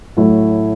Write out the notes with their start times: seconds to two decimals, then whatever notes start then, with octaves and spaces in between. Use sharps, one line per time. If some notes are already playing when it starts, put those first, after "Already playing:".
0.17 A2 F#3 A3 E4